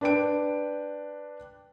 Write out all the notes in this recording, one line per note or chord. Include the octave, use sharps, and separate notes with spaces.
D4 B4 G5 D7